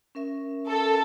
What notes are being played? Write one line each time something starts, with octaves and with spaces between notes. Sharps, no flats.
C#4 A#4 E5
A4